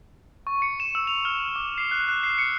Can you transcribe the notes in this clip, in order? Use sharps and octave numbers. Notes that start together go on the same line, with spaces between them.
C#6
C#7
E7
E6
F7
F6
D6
C7
F#6
F#6
C7
C#7